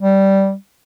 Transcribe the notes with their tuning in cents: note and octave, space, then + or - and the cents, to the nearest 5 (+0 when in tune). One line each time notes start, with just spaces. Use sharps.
G3 -10